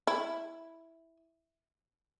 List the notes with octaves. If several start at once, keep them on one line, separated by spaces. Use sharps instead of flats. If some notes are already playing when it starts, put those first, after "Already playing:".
E4